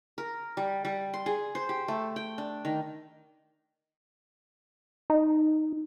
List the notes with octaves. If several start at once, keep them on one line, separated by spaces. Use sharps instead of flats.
A#4
G3
G3
C6
G#4
C5
G4
A3
G5
D4
D#3
D#4